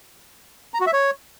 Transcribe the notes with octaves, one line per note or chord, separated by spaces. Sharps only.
A#5
F#4
E5
C#5